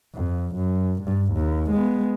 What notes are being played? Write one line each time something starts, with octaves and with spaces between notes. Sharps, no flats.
F2
F#2
G2
D#2
G#3 B3